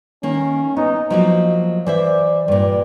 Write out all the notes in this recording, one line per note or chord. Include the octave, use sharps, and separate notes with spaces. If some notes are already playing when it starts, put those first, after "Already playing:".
D#3 A#3 C#4
B3 D#4
F3 F#3 A#3 D#5
E3 C5 D5 E5
G2 A#2 D5